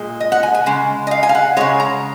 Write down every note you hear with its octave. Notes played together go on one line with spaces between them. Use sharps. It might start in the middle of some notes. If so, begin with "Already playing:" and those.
Already playing: A#2 G#3
D#5
F#5
G#5
G#5
C#3 G#3
D#5
F5
G#5
F5
F#5
C#3 G#3 C#5
A#5